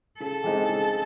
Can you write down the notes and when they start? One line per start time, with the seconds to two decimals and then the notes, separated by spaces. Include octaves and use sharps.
0.20 C#3 A4
0.44 E3 G#3 C4 D#4
0.69 C#3